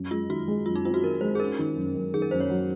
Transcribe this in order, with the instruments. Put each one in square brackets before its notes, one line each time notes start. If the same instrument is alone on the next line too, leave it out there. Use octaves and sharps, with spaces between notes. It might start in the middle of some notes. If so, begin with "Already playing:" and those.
Already playing: [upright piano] F#2
[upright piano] G#3 [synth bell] F4
[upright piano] D#3 [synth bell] F#4
[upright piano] G#3
[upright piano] F#2 [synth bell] F4
[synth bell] D#4
[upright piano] C4 [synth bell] F4
[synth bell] F#4
[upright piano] D#3 [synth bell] A#4
[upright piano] G#3 [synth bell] C5
[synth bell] G#4
[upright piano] C#4 [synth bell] A#4
[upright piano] D#3
F#2
F#2
[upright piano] D#3 [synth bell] G#4
[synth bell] A#4
[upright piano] F#2 [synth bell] C5
[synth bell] C#5
[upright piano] F#3